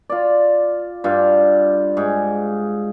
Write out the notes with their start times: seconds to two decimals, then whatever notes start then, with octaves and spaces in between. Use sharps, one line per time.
0.10 F4 D5
1.04 G2 F4
1.97 G#2